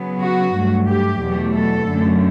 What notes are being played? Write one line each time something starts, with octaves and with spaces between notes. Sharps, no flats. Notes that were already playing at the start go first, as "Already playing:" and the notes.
Already playing: C#3 F#3 B3
F#4
G2 F#3 A3
G4
E2 B2 F#3 A3
A4
F#2 D3 A3